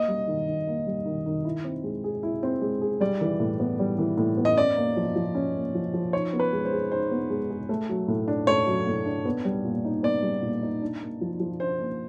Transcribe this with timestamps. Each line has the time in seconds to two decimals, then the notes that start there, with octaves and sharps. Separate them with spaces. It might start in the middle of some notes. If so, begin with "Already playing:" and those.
Already playing: A#3 D#5
0.08 G3
0.28 D#3
0.48 D#3
0.67 A#3
0.86 G3
1.05 D#3
1.26 D#3
1.45 E4
1.64 C4
1.84 G#3
2.04 G#4
2.23 E4
2.43 C4
2.61 G#3
2.81 G#4
3.00 G3 D5
3.21 E3
3.40 A2
3.60 B3
3.79 G3
3.98 E3
4.18 A2
4.37 B3
4.45 D#5
4.57 C#4 D5
4.76 A#3
4.97 F3
5.16 F3
5.35 C#4
5.54 A#3
5.75 F3
5.94 F3
6.13 D#4 C#5
6.33 B3
6.40 B4
6.53 G#3
6.65 C5
6.72 G#4
6.91 D#4 C5
7.11 B3
7.30 G#3
7.50 G#4
7.69 A3
7.89 F#3
8.08 A2
8.28 D4
8.47 A3 C#5
8.67 F#3
8.87 A2
9.05 D4
9.25 B3
9.45 G3
9.64 A#2
9.85 D#4
10.03 B3 D5
10.22 G3
10.43 A#2
10.63 D#4
10.82 D4
11.01 A#3
11.21 F3
11.40 F3
11.60 D4 C5
11.79 A#3